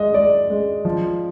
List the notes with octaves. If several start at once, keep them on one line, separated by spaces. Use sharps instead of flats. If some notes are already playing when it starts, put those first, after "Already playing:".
Already playing: G#3 D#5
G#3 D5
G#3
F3